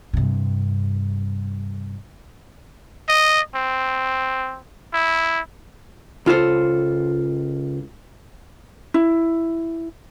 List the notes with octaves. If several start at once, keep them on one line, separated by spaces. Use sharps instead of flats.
G2 C3
D#5
C4
E4
C#2 F4 A4 C5
E4